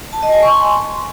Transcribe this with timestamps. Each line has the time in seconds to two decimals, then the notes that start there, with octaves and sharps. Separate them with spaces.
0.13 A5
0.23 D#5
0.32 G#5
0.42 C#6
0.52 C6